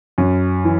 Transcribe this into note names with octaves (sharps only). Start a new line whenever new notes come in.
F#2
E3